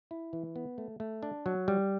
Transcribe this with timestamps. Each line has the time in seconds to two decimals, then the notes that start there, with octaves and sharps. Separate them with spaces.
0.11 E4
0.33 E3
0.56 B3
0.78 A3
1.00 A3
1.23 D4
1.46 F#3
1.68 G3